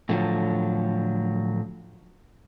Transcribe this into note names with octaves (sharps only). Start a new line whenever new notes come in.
A2 D3 F3 F#3